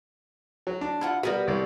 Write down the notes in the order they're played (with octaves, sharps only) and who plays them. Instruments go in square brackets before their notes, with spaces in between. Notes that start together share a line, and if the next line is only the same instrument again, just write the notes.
[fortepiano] F#3
D4
[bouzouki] E4 F4 F#5
[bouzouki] G3 B3 B4 [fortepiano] F#4 A#4
[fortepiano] C2 D5